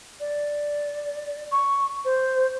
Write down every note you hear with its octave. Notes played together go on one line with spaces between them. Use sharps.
D5
C#6
C5